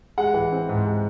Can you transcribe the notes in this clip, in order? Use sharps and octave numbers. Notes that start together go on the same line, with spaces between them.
G#3 F#5
E3
C4
G#2
G#3